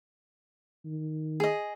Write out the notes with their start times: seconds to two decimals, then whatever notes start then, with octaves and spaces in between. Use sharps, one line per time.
0.84 D#3
1.40 G#4 D#5